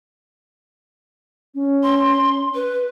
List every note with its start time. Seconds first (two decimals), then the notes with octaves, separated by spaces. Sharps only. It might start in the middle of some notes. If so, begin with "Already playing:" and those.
1.55 C#4
1.83 C6
2.55 B4